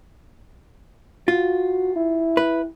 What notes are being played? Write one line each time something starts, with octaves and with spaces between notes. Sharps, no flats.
F4 F#4
E4
B4